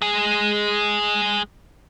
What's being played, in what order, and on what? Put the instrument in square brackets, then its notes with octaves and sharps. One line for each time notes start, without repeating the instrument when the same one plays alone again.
[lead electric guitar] G#3 G#4